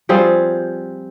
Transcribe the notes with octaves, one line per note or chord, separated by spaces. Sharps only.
F3 G3 C4 G#4